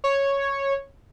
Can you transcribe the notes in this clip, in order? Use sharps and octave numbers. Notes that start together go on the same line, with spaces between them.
C#5